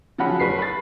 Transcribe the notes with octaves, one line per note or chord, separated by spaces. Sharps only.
C#3 F3 F#3 C#4 F#5 B5
F#1 B4 B6 C7
B5 A6